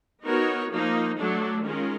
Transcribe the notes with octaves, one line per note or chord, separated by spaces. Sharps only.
B3 D#4 F#4 A#4 C#5
F3 A#3 D#4
F#3 A3 D4
D#3 G#3 C#4 F4 A#4